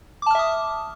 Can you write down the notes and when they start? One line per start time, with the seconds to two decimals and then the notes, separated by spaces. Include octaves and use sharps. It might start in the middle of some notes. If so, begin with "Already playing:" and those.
0.22 D6
0.26 A5
0.31 F6
0.35 E5
0.39 D#6